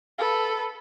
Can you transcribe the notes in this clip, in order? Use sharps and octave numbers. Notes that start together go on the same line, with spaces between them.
A4 B4